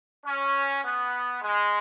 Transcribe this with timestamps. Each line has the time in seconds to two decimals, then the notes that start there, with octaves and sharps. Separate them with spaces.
0.24 C#4
0.83 B3
1.42 G#3